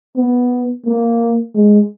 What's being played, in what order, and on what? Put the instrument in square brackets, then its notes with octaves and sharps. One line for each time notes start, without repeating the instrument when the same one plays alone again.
[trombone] B3
A#3
G#3